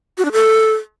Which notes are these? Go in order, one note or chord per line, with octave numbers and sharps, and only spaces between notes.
F#4
D4
A4